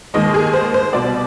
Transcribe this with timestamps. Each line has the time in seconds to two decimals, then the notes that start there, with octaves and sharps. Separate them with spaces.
0.14 D#2 D#3 G#3 D#5
0.34 G#4
0.53 C5
0.74 C5
0.93 C2 B2 G3 D5